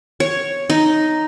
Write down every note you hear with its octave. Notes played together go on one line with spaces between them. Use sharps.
C#5
D#4